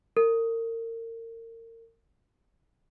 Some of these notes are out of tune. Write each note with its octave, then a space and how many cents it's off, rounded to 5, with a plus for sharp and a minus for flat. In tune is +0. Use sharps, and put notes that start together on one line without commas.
A#4 -35